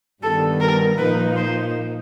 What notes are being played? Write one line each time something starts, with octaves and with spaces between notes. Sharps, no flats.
G2 D#3 G3 B3 A4
A#4
A#2 F3 A#3 D#4 B4
C5